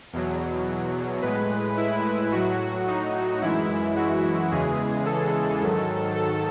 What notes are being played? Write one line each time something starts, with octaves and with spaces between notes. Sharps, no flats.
E2 B2 F#3
A2 G#3 B4
E4
A2 F#3 F#4
D#4
F#2 E3 G#3 E4
F#4
E2 C#3 E3 G#3 G#4
A4
G#2 D#3 F#3
A4